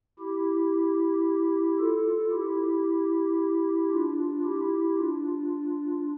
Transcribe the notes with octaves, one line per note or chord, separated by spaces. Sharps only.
E4 G4
F4 A4
E4 G4
D4 F4
E4 G4
D4 F4